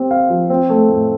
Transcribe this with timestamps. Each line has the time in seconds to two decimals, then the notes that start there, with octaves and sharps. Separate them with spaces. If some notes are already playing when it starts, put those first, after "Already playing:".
Already playing: C4 G4
0.11 F5
0.30 F3
0.50 C4
0.69 A3
0.89 A2